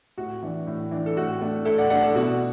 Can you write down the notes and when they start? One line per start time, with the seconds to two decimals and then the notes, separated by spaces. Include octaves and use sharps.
0.18 A2 F#4
0.43 E3 D4
0.67 A2
0.91 E3 D4
1.06 A4
1.17 A2 F#4
1.41 A3 D4
1.65 A2 E4 A4
1.78 D5 F#5
1.90 A3 D4 D5 F#5
2.02 A4 D5
2.15 B2 F#4